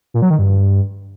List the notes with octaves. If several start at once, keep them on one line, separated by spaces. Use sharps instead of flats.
A#2
F#3
D#3
G2